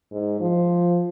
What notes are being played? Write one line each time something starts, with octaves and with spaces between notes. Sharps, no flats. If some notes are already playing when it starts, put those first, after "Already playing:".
G#2
F3